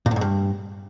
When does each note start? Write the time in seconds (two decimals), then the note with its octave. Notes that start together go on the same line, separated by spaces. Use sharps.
0.06 A#2
0.11 A2
0.16 G#2
0.21 G2